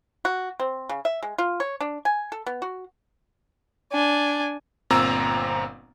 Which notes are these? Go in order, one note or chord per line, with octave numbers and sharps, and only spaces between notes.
F#4
C4
C#3
E5
G#3
F4
C#5
D4
G#5
A4
B3
F#4
D4 G#5
G1 A#2 C4 A#5 E6